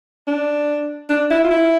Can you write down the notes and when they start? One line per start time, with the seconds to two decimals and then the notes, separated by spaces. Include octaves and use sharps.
0.27 D4
1.10 D4
1.30 E4
1.44 F4
1.51 E4